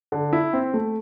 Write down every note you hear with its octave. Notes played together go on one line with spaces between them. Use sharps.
D3
E4
C4
A3